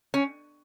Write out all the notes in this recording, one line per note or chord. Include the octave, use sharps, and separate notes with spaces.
C#4